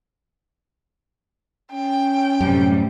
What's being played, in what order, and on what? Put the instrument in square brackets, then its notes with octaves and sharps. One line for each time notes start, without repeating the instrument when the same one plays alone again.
[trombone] C#4 [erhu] G5
[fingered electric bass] F#2 [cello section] A2 C3 G3